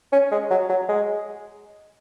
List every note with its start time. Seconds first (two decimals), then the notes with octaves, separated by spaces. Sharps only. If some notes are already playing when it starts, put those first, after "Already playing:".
0.12 C#4
0.31 G#3
0.50 F#3
0.69 F#3
0.89 G#3